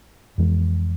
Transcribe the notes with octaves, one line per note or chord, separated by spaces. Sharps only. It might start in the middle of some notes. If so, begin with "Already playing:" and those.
F2 E3 G#3